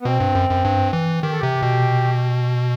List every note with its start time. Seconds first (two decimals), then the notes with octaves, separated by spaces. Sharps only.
0.01 B3
0.05 B2 C4
0.20 G2
0.35 F#2
0.50 F#2
0.65 G2
0.93 E3
1.23 D#3 G4
1.32 A4
1.39 C3 G4
1.62 B2